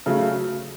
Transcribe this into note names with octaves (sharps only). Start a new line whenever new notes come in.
C#3 F#3 A3